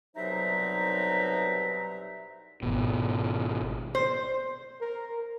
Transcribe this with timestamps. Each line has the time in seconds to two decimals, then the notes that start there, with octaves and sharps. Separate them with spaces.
0.16 C2 B2 F#3 D#4 C5 E5
2.63 G#1 B2
3.95 C5
4.81 A#4